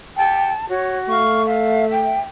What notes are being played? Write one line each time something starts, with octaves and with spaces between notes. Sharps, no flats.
G4 F#5 G5 A5
F#4 C#5
A3 F5 C#6
E5 F5
G5